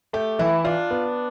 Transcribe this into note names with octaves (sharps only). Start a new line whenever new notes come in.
A3 G4
E3 E4
D4 F4
B3